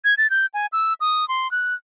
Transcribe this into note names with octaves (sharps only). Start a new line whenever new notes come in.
G#6
A6
G6
G#5
E6
D#6
C6
F#6